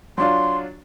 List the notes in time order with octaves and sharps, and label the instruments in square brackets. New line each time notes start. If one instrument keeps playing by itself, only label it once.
[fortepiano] F#3 D4 F4 [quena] C6